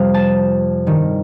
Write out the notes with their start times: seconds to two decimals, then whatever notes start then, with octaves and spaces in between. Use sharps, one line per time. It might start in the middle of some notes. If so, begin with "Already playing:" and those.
Already playing: F2 C3 G3 F5
0.14 A5
0.86 G2 D#3 G3